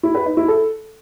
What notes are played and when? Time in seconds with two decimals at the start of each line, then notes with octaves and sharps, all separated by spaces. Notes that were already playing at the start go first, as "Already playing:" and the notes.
0.03 E4
0.15 B4
0.26 D#4
0.37 E4
0.48 A4